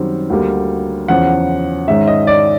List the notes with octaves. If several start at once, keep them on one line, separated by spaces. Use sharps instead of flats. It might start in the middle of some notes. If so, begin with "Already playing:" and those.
Already playing: F#2 D#3 G3 C4
D2 D3 G3 A#3
E2 C#3 F3 F#5
G#2 D#3 G#3 C#4 E5
D#5
D5